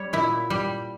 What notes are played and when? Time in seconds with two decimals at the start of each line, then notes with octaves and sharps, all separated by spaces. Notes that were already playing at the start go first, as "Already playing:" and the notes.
Already playing: G3 C#5
0.13 A#2 E4
0.50 G3